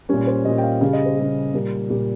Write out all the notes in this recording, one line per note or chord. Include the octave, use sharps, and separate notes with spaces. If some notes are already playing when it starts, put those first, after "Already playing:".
A#2 G3 C#4
C5
A#2 G3 D#5
G5
F5
C#3 G3 F5
D#5
C5
C#3 G3
A#2 G3 A#4
A#2 G3 G4